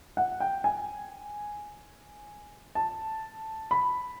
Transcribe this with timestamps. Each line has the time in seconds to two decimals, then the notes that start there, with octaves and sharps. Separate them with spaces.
0.17 F#5
0.40 G5
0.64 G#5
2.75 A5
3.71 B5